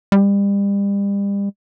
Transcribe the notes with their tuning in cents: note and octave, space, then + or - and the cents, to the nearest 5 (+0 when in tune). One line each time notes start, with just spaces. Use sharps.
G3 +35